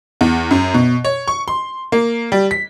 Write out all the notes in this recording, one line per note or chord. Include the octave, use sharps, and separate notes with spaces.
E2
F#2
B2
C#5
C#6
C6
A#3
G3
B6